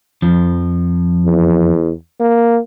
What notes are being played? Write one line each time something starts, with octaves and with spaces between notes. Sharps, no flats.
F2 F3
E2
A#3